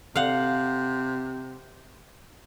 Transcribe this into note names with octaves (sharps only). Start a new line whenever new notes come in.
C3 F5 F#5